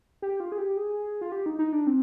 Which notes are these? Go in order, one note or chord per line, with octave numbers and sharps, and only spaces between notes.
G4
F4
G#4
G4
G#4
F4
G4
D#4
D#4
D4
C4